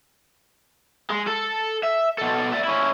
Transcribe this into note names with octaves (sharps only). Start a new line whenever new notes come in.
G#3
A4
E5
B2 A4
D5 E5
C#4 E4